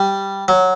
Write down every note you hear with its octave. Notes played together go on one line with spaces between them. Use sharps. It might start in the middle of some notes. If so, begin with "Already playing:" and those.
Already playing: G3
F#3